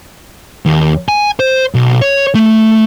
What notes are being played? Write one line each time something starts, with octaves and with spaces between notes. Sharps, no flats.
D#2
G#5
C5
B1
C#5
A3